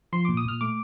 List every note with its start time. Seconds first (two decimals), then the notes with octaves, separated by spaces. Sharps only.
0.12 F3 C6
0.25 A#2 D6
0.37 D#6
0.45 A#2 F6
0.61 A3 D6